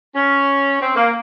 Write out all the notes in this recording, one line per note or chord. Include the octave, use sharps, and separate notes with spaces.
C#4
C4
A#3